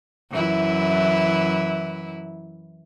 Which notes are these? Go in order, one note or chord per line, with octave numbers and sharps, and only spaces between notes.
F#2 E3 E4